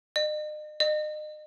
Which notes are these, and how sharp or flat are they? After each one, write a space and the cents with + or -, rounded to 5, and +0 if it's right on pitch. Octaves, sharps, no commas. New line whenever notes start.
D#5 -40
D#5 -35